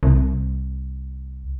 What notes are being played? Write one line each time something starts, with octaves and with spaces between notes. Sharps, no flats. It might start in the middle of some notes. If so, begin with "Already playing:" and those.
C2